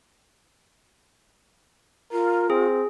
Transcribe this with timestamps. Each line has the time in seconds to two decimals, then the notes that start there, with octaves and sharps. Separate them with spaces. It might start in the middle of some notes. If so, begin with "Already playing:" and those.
2.12 F4 A#4
2.50 C4 G#4